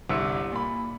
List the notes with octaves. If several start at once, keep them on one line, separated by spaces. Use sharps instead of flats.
G1 C2 E4 E6 C#7
A#2 B5